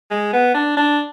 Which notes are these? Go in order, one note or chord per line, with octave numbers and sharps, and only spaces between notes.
G#3
B3
D4
D4